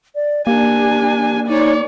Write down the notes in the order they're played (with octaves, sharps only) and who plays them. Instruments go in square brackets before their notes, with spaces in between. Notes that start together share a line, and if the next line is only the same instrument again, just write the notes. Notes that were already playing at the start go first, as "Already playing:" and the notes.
[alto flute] D5
[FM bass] A#3 [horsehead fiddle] D4 G#5 [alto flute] G4
[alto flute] D#4 [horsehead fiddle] C#5 D5